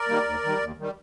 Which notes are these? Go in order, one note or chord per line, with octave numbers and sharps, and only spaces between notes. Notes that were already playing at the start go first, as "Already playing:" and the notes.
Already playing: A#4 D5
D#3 G3 A#3
D#2
D#3 G3
D#2
D#3 G3